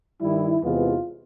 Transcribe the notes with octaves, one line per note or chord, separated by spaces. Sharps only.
G2 D#3 G3 E4
E2 C3 E3 G#3 B3 F4